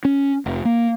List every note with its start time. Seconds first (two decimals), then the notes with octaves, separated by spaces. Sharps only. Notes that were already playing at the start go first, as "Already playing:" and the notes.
0.05 C#4
0.46 F1
0.65 A#3